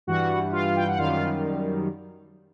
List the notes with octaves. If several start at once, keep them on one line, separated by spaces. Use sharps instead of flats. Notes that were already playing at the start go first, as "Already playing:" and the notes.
G2 E3 G3 F#4 F#5
F4 F5
G5
F#5
F#2 D#3 G3 F4 F5